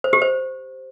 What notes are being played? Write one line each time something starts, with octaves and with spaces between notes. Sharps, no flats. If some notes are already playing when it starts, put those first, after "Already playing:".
C5
G4
C5